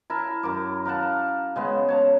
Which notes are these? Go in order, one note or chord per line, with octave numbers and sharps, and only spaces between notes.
E4 A#4 A5
F#2 A#4 D6
A#4 F5 F#5 A5
C#3 G#3 B3
C#5 A5 A#5